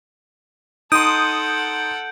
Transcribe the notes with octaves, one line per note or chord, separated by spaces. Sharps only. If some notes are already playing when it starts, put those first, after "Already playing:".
D#4 A4 F#5 C6 D#6 G6 D7